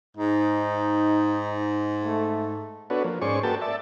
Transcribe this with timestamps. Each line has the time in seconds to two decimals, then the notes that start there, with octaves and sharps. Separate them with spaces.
0.17 G#2 D#4
2.04 A3
2.90 B3 D4 F#4 A4 B4 C#5
3.04 F3 A#3
3.22 G#2 C#4 G#4 C5 D5 C#6
3.43 A#3 F#4 A4 B4 G5 A5
3.61 D5 E5 A5